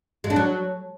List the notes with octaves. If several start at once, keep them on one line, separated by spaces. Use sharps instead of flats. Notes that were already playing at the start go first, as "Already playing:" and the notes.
G#3
D4
F#3